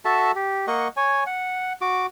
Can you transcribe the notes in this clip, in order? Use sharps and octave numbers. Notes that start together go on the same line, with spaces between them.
F#4 A4 E5 A5
G4
A#3 D#5 F#5 C#6
C#5 G#5
F#5
F#4 D6